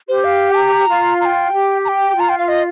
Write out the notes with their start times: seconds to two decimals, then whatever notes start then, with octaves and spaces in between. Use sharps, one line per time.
0.09 G4 C5
0.24 F5
0.56 A#5
0.88 F4
1.21 A#5
1.25 G5
1.52 G4
1.85 A#5
1.88 G5
2.15 F4 A#5
2.29 G5
2.38 F5
2.48 D#5